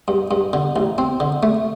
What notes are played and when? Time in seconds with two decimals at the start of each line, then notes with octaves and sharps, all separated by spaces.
0.08 G2
0.31 G2
0.53 D3
0.76 A1
0.98 C4
1.20 D3
1.43 A3